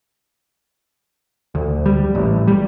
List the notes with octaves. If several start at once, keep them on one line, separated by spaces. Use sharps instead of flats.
D2
G3
A1
G3